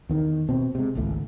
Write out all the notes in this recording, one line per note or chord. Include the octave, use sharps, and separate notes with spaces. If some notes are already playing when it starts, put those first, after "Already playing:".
E2 D#3
B2 C4
C3 G#3
G#1 C#2 A2 A3